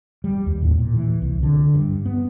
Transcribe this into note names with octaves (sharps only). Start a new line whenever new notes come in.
G3
D#2
A2
A#2
E3
C2
D3
G2
B3